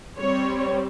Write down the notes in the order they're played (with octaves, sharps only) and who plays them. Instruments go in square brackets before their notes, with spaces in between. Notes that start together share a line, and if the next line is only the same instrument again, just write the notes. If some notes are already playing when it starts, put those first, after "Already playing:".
[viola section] G3 C4 C#5